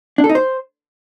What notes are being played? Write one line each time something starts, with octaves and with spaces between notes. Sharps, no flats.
D4
A4
D#4
C5